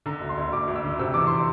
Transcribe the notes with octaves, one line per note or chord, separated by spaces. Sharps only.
D3 A#5
D2
C6
D2
D2 D6
D2 D6
E6
D3
C3 E6
E2 D6
C6